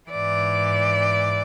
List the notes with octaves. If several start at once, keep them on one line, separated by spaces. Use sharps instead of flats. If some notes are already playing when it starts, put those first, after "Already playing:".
G#2 E3 D5